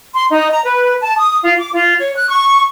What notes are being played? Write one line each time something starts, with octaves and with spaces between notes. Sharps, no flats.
C6
D#4
A#5
B4
A5
D#6
F4
D6
F4
C#5
F#6
C#6